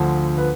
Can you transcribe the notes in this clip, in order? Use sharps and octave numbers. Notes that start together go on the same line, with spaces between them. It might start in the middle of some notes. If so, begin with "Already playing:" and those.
Already playing: D2 D3 F3
B4